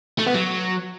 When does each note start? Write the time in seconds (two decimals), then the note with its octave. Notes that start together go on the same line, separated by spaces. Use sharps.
0.19 A3
0.27 B3
0.34 F#3